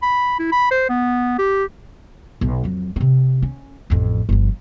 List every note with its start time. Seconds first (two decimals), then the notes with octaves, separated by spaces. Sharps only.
0.02 B5
0.39 E4
0.52 B5
0.71 C5
0.89 B3
1.38 G4
2.41 B1
2.63 F2 F#3
2.96 C3 C4
3.42 C#4
3.90 A1 F2
4.29 G1 F3